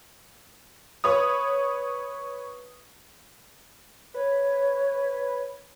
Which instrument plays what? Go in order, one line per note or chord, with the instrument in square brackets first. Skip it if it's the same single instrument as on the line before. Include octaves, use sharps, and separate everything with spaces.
[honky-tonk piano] B4 C#5 D#6
[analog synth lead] B4 [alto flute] C#5